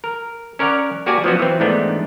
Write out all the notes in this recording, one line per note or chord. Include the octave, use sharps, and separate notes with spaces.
A#4
C#4 A#4 C#5 D5 F#5
A#3 F#4 G4 D5 G#5 A5
F3 F#3 B3 C#4 F#4
E3 C4
G#2 E3 A3 B3 D4 D#4